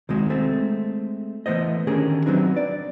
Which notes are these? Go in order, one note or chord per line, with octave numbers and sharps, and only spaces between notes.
C2 D#3 G#3 F#4
G#3 A3 C4
E3 A3 B3 C5 D#5
D3 D#3 C#4 G4 G#4 A#4
F#3 A3 B3 C4 D4 D#4
D5